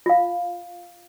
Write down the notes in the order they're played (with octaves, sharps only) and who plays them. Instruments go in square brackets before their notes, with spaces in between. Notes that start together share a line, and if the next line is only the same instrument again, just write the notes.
[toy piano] F4 F5